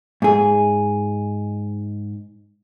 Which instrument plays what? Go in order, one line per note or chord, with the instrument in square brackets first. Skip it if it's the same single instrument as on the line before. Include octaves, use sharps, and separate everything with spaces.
[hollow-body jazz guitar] G#2 G#4